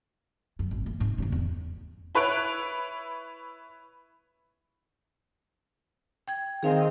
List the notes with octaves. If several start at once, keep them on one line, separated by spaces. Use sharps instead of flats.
F#2
G#1
A#3
G#2 C#4
D1 G#2
E2 D4
E4 B4 C#5 F#6 D7
G5 G#6
D#3 C4 G#4 D#5 F5 G#5